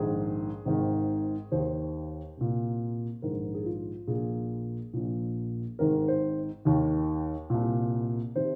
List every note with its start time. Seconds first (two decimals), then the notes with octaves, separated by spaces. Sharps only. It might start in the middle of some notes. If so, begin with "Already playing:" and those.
Already playing: A#1 G#2 D#3 G#4
0.65 G#1 G#2 D#3
1.52 D#2 D#3 C5
2.37 C2 A#2
3.22 A#1 G#2 D#3 A#4
3.54 G#4
3.66 F4
4.08 A#1 A#2 G#4
4.93 A#1 A#2
5.79 G#1 G#2 D#3 A#4
6.08 C5
6.65 D#2 D#3
7.50 C2 A#2
8.36 C3 D#3 C5